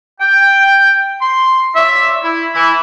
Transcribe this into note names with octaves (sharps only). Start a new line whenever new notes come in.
G5
C6
F4 C#5 D5 E5
E4
E3 E4